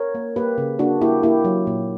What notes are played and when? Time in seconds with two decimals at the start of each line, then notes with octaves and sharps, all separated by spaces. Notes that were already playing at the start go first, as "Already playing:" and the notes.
Already playing: A#4 C#5
0.15 A#3
0.36 A#3 G4 B4
0.58 C#3
0.79 A#3 D4 F#4
1.01 A#3 E4 G4
1.23 A#3 E4 G4
1.45 F#3
1.67 A#2